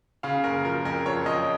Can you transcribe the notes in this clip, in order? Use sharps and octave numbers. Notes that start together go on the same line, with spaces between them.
C#3 F5
F#1 A#4
F3 A#4
F2 A#4
F3 C#5
F3 D#5